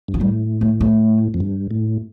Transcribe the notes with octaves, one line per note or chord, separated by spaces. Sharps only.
G2
F3
A2 G3
A3
A3
F2
G2
A2